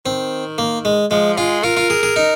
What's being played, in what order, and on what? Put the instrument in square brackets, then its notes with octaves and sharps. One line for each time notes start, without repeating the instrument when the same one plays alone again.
[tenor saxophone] D#3 [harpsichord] C4
[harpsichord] A#3
G#3
[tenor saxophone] F3 [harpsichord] G#3
[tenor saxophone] G#3 [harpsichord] F4
[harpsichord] F4 [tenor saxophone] A#4
[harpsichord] F4
G#4
G#4
D#4